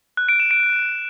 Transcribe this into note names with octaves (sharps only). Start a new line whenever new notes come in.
F#6
D7
E7
D7